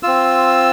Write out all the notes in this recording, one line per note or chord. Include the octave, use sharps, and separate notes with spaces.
C4 F4 E6